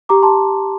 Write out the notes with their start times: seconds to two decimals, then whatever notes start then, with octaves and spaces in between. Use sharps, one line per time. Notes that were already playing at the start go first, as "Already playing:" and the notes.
0.09 G4 A#5 D6
0.23 A5 C6